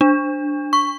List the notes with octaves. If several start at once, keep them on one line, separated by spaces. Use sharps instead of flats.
D4
C#6